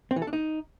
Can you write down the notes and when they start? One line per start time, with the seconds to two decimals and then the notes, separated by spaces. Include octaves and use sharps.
0.11 C4
0.16 E3
0.22 A4
0.27 D4
0.33 D#4